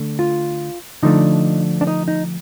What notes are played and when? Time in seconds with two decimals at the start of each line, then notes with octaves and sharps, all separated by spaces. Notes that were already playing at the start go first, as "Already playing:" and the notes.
Already playing: D3 A3
0.19 F4
1.03 D3 F3 A3 D4 D#4
1.81 D4
1.87 D#4
2.08 D#4